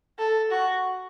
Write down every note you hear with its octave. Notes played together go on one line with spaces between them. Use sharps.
A4
F#4